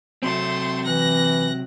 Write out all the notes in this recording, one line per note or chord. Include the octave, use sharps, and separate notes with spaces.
C3 F#3 A3 C4 C6
E3 F#6 A#6